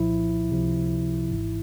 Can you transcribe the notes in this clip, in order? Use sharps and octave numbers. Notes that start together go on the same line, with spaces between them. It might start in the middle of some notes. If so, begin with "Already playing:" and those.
Already playing: C2 A#2 F3 E4
C#2 C3 F3
G#1 G#2 E3